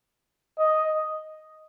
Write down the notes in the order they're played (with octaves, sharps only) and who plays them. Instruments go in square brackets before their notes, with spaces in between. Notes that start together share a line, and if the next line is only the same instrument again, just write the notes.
[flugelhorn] D#5